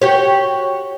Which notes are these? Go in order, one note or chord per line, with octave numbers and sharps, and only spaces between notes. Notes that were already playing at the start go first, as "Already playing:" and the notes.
F#4 G4 C#5